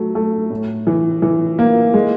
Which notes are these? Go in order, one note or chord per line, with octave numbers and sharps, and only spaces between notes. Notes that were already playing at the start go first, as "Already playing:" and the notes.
Already playing: F#3 A3
A3
A2
E3
E3
A#3
G#3